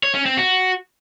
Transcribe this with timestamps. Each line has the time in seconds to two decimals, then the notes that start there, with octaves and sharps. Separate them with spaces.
0.03 C#5
0.15 C#4
0.26 C4
0.37 F#4